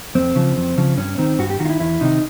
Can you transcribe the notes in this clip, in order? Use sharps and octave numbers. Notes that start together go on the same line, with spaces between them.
F2 C4
C#3 F3
F2
C#3 F3
G2 C#4
D#3 C4
G2 F#4
G4
D#3 F#4
F4
E4
E2 E4
C3 D#3 D#4